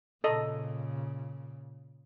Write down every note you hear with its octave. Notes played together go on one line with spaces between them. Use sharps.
A#2 C#3 A4 D#5